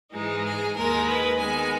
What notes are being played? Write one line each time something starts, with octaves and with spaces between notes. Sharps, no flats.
G#2 E3 G#3 D#4 G#4
G#4
D#2 D#3 G#3 A#4
B4
D#3 G#3 B3 G#5